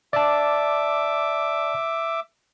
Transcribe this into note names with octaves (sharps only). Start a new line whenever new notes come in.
D5 E5 A5 D6